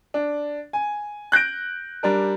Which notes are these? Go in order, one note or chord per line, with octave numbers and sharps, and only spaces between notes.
D4
G#5
F#6 G6 A#6 D7
G3 D4 A#4